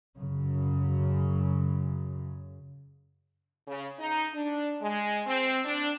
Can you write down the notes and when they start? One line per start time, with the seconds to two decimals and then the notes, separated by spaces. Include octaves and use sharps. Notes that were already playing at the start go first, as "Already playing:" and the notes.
0.17 F#2 C#3
3.68 C#3
3.99 D#4
4.34 D4
4.82 G#3
5.27 C4
5.65 D4